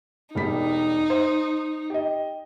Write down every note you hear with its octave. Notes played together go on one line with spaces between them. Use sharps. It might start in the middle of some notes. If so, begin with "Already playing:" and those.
E1 G3 D#4 B6
C5
G4 D#5